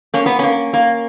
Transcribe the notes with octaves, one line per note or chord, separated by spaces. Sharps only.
A#3 C#4
B3
A#3 C#4
A#3